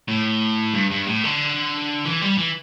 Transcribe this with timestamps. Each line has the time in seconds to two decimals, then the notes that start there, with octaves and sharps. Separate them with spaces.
0.08 A2
0.74 G2
0.91 G2
1.07 A2
1.24 D3
2.05 E3
2.21 G3
2.38 E3